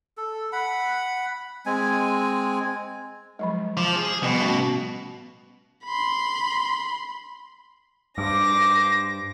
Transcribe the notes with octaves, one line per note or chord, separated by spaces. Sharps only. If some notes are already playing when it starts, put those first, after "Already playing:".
A4
F#5 B5
G#3 C4 G#5
F3 F#3 G#3
F3 D6
G#4
B2 F3 G3 B3
A3 C#4 F#4
B5 C6
G2 C5 D6 A#6